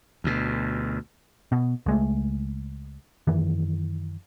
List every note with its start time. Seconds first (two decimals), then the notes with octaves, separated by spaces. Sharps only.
0.24 D2 B2
1.52 B2
1.86 C#2 G#3 A3
3.27 F#2 D#3 E3